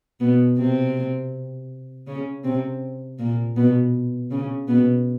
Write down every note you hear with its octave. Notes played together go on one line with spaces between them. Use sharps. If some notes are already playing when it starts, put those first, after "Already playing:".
B2 B3
C3 C4
C#3 C#4
C3 C4
A#2 A#3
B2 B3
C#3 C#4
B2 B3